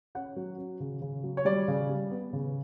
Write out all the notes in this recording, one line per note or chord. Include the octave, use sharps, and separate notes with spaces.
C#4 F#5
F#3
C#4
C#3
C#3
F#3
C#5
G3 D5
C#3
G3
B3
C#3